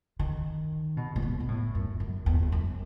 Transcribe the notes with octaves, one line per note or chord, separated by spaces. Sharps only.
D#3
B2
A2
B2
B2
A2
F#2
F#2
E2
E2
F#2